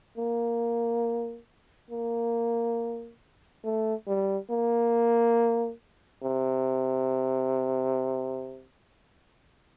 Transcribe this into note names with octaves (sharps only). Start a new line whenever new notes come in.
A#3
A#3
A3
G3
A#3
C3